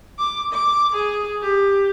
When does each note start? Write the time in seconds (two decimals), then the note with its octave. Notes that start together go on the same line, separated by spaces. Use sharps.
0.18 D6
0.52 D6
0.95 G#4
1.43 G4